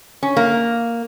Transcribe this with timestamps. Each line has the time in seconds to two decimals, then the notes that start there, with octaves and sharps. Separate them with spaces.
0.23 C#4
0.37 A#3